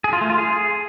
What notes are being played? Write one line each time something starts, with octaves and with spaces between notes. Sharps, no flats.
G#4
F4
A3
F4
G#4